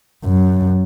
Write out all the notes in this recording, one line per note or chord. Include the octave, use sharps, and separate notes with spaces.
F#2